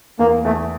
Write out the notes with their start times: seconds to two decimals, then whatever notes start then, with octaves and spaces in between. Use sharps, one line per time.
0.19 E2 A#3
0.45 E2 A3